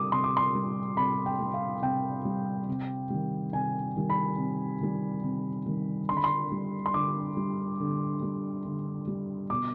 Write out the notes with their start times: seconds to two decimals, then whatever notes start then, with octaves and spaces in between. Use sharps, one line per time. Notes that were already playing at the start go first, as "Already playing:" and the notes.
Already playing: C3 G3 D6 D#6
0.12 C3 C6
0.24 D6
0.37 C6
0.55 G3
0.97 C3 B5
1.26 G5
1.40 G3
1.54 F5
1.82 C3 G5
2.25 G3
2.68 C3
3.10 D#3 G3
3.53 C3 G#5
3.96 D#3 G3
4.10 B5
4.38 C3
4.81 D#3 G3
5.23 C3
5.66 D#3 G3
6.09 D3 C6
6.17 B5
6.24 C6
6.51 G3
6.86 C6
6.94 D3 D6
7.37 G3
7.80 D3
8.22 G3
8.65 D3
9.07 G3
9.50 B2 D6